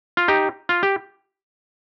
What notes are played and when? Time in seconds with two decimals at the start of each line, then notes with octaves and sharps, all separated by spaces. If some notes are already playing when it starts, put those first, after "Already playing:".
0.17 F4
0.28 D#4 G4
0.69 F4
0.83 G4